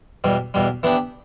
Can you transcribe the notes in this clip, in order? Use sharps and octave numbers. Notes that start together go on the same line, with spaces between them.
E2 B2 G3
E2 B2 G3
E3 B3 D4 G4